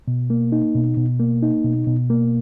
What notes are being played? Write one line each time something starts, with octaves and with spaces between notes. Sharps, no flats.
B2
A#3
D#4
B2
B2
A#3
D#4
B2
B2
A#3